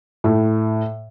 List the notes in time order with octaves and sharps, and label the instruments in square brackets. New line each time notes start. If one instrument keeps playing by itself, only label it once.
[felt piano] A2